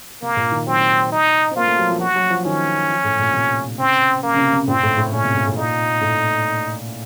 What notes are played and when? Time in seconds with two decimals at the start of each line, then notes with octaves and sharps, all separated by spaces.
0.22 C3 A#3
0.37 A#2
0.52 D#3
0.67 F#3 C4
1.12 D#4
1.51 C4
1.56 A#3 F4
1.67 A3
1.79 F#3
1.89 F3
2.00 F#3 F#4
2.16 F#3
2.30 F3
2.45 D#3 C#4
2.90 F3
3.04 A2
3.19 A#2
3.34 C3
3.78 C#3 C4
4.23 C#3 A#3
4.34 C#3
4.38 C3
4.53 C3
4.68 A#2 C4
4.83 A2
4.98 A2
5.12 A#2 C#4
5.24 C3
5.35 A#2
5.46 A2
5.57 A#2 D#4
6.01 A2